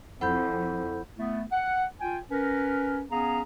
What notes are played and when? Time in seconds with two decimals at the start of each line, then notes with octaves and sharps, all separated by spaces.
0.21 F2 E4 A4 C5 F#5 B5 G6
1.17 A3 B3 E4
1.51 F#5
2.00 F4 G5 G#5
2.30 C#4 A#4 B4
3.10 B3 C#4 G#4 F5 A#5